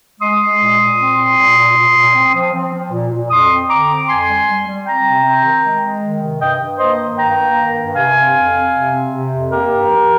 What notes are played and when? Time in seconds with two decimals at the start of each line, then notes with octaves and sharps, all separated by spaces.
0.20 G#3 C6 D#6
0.40 G#3
0.60 A#2
0.79 A#2
0.98 C4
1.17 A#2
1.36 A#2
1.56 A#2
1.76 A#2
1.96 A#2
2.15 C4
2.34 F3
2.53 C4
2.73 F3
2.91 A#2
3.11 A#2
3.30 F2 C6 D#6
3.50 C4
3.69 D3 A#5 D6
3.89 C4
4.08 F2 G#5 C6
4.27 G3
4.47 G3
4.67 G3
4.85 C4 G5 A#5
5.04 C3
5.24 C4
5.43 D#3
5.63 G#3
5.82 G#3
6.02 D#3
6.21 C3
6.40 G2 D#5 G5
6.60 G2
6.78 A#3 C5 D#5
6.99 D#3
7.17 G2 G5 A#5
7.38 A#3
7.57 D#3
7.76 G2
7.95 C3 F5 G#5
8.14 C4
8.34 F2
8.53 C4
8.72 C3
8.91 C4
9.11 C3
9.31 F2
9.49 A#3 G4 A#4
9.69 G2
9.88 F3